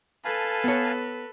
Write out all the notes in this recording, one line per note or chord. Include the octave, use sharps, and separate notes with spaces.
A4 B4 F5 G#5 A5
B3 C#5